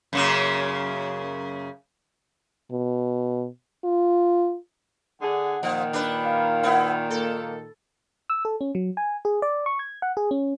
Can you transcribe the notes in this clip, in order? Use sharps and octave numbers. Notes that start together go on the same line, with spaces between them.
F#2 C#3 A#3
B2
F4
D3 G#4 F#5
A#2 D#3 F3
D4 B4
F5
B3 E4
A#3 A4
E6
A4
C#4
F#3
G#5
G#4
D5
C#6
G#6
F#5
G#4
C#4